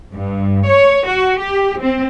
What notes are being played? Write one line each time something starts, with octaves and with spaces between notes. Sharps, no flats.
G2
C#5
F#4
G4
C4